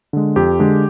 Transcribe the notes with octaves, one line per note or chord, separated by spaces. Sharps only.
D3 G#3
F2 G4
D3 G#3